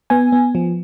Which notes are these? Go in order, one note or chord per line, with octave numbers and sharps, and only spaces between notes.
B3 G#5
B3
F3